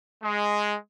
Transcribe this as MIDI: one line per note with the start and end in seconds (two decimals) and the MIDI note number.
0.23 0.75 56